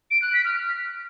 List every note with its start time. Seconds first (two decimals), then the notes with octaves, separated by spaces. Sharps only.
0.11 D7
0.22 F#6
0.33 B6
0.45 F6